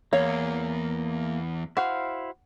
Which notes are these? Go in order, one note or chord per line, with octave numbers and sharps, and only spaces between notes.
E2 A#3 C#5 F5
E4 F#4 C5 F5